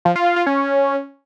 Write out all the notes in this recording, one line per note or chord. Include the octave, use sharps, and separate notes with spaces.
F3
F4
F4
F4
C#4